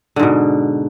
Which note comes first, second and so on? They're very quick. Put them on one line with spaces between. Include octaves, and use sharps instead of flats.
D3 G#2 B2